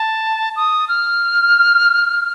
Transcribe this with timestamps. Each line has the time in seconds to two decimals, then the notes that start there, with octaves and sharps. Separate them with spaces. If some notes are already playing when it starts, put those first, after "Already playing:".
Already playing: A5
0.56 D#6
0.88 F6